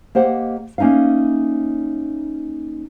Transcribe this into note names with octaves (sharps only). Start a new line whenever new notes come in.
A#3 G4 C5 D#5 F#5
A#3 C#4 D#4 E5 F5